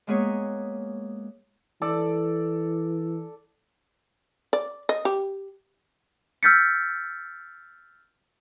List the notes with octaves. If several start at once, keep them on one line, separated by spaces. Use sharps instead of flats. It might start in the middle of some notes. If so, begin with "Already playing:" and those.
G#3 A#3 B3 G#4 C#5
E3 A4 D5
D5
D#5
G4
E6 F6 G6 A6 B6 C#7